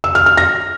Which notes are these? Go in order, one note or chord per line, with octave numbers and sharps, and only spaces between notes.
E6
F6
F6
A#6